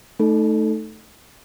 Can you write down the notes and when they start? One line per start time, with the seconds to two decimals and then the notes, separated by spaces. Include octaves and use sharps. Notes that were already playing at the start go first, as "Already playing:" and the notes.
0.19 A3 D#4 A4